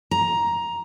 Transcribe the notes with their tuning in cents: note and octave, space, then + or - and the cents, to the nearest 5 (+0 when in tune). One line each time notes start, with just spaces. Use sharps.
A#5 +10